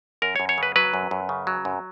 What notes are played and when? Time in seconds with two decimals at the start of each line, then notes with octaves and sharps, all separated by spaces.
0.22 F#2 A#4
0.36 F#2 C#5
0.49 C#5
0.58 C#3 B4
0.76 F#3 B4
0.94 F#2
1.11 F#2
1.29 C#3
1.47 F#3
1.65 F#2